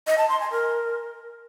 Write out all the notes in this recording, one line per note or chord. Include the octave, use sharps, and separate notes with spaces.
D#5
A5
C6
G#5
A#4